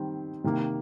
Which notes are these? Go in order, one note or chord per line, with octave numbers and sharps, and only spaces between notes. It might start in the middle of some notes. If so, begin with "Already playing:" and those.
Already playing: D#3 G3 C4
C3 D#3 A#3